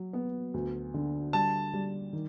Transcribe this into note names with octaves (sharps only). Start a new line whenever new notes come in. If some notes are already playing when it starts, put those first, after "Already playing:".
Already playing: F#3
B3
D2
D3
G3 A5
G3
D#3